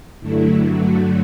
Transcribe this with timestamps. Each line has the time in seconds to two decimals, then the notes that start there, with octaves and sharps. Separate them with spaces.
0.20 G2 D3 F#3 A3 E4
0.64 F#4